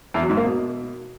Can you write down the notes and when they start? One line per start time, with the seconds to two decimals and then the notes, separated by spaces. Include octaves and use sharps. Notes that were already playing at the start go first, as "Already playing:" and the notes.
0.14 E2
0.22 F#3
0.30 G#2
0.37 A#3
0.45 B2